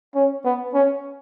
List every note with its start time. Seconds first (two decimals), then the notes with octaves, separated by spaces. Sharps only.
0.15 C#4
0.45 B3
0.74 C#4